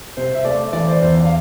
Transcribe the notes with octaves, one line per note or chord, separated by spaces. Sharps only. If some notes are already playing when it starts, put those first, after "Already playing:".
C3 C5
E5
A3 D5
E3 D5
C5
E2 C5
D5
F5